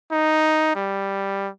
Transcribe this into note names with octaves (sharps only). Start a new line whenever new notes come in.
D#4
G3